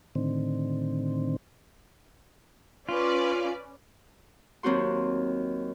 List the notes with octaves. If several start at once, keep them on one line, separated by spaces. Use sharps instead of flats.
A2 D3 D#3 C4
C#4 F4 B4 D5
D#2 F#3 C4 F#4 C6